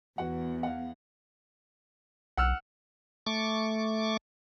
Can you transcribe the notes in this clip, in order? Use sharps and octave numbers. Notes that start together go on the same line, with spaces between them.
E2 F#4 B4 F#5
F5 F#5
B1 F#5 E6 F6
A3 C#6 D6